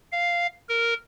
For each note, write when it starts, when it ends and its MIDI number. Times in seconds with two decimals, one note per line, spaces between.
0.12 0.47 77
0.69 0.94 70